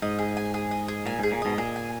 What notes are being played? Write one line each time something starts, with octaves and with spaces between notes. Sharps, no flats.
G#2 D#5
G#4
G#5
G#4
D#5
G#4
A#2 G#5
G#2 G#4
A#2
G#2 B2 D#5
A#2 G#4
G#5